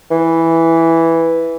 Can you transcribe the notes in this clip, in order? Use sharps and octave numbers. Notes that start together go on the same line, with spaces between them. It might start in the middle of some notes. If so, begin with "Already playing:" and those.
E3